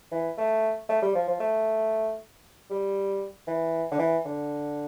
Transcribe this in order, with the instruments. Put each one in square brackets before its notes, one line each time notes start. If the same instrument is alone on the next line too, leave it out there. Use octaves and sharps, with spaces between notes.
[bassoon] E3
A3
A3
G3
F3
F3
A3
G3
E3
D3
E3
D3